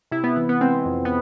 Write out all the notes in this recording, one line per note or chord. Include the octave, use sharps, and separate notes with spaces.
C3 E4
B3
E3 B3
B3
G#3 C4
F2
B3